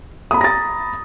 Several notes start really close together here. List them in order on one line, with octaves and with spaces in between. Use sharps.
D#6 B5 A#5 A#6 A6